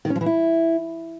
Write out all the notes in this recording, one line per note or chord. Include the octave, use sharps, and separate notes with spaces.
D#3
C#4
F3
E3
E4